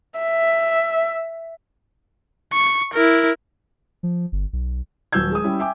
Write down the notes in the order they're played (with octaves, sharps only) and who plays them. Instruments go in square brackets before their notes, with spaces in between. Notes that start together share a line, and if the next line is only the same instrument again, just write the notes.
[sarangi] E5
[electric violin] C#6
E4 A#4
[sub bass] F3
G1
B1
[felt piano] D#1 F#3 E6 G6 G#6
G#3 D#6
G3 C#4 E4
E5 G5 G#5 D6